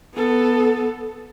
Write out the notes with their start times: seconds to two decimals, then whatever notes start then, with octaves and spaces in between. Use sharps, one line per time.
0.15 B3 A4